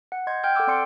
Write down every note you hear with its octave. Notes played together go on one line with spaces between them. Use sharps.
F#5
D#5 C6 G6 G#6
G5 F6 G6
A4 F#5 G5 D6 E6
C4 D5 C6 C#7 D7